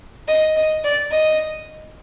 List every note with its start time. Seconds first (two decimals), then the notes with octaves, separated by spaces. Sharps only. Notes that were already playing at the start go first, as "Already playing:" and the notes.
0.28 D#5
0.56 D#5
0.84 D5
1.11 D#5